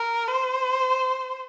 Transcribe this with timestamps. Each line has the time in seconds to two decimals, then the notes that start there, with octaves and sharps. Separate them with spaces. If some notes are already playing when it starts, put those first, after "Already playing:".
Already playing: A#4
0.28 C5